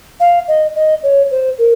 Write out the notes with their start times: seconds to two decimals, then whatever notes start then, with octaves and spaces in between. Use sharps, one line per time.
0.20 F5
0.48 D#5
0.75 D#5
1.03 C#5
1.31 C5
1.58 A#4